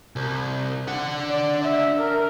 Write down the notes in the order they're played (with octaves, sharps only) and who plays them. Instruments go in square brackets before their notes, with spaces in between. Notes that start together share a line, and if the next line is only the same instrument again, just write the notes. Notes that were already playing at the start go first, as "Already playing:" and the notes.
[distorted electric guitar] C2
D4 F#5
[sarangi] D5
E5
A#4